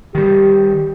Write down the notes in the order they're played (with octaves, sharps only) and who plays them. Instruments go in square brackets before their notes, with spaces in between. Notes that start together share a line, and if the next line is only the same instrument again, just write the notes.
[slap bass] D#3 G3 [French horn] G4